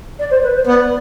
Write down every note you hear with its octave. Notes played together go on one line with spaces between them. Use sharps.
D5
C5
B4
C5
B3 D5